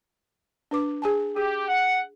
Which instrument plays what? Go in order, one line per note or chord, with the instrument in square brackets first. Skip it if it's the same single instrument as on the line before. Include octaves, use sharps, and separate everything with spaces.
[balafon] D4 B4 D6
G#4 G#5 A5
[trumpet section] G4 [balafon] G#4
[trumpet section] F#5